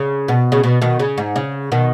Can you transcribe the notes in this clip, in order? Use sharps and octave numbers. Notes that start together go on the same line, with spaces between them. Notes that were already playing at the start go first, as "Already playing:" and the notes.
Already playing: C#3
B2
C#3
B2
B2 D#3
C#3
G#2
C#3
B2 D#3